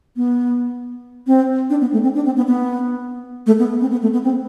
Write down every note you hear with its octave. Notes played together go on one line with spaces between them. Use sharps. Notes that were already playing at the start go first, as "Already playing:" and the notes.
B3
C4
D4
B3
A3
C4
D4
C4
B3
B3
A3
B3
C4
B3
A3
B3
C4